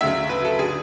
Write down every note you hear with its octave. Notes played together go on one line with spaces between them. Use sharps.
D2 C#3 F#3 E5
B4
A4
D3 G#4